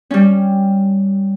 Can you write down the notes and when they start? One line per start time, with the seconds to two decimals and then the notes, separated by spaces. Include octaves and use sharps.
0.11 G3 C#4